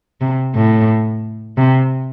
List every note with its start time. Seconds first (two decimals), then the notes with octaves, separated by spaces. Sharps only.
0.21 C3
0.55 A2
1.58 C3